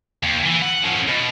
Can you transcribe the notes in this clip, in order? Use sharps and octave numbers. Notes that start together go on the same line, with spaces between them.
D#2
E3
F#5
F3 C#4
B2